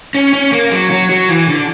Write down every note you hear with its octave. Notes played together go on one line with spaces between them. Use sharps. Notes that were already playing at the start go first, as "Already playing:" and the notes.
C#4
C#4
A#3
F#3
F#3
F#3
E3
D3